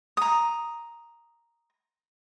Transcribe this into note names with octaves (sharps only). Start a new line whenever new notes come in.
A#5 D#6